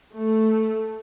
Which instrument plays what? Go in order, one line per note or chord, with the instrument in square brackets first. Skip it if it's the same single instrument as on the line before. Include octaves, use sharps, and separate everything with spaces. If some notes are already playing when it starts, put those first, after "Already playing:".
[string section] A3